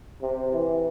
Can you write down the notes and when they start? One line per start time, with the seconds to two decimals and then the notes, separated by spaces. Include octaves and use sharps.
0.22 C3
0.52 E3